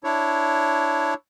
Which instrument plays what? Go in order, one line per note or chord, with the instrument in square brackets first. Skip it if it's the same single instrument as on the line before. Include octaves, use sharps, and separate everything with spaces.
[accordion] D4 E4 C#5